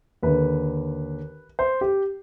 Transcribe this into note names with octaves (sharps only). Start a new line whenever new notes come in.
D#2 D3 B4
C5
G4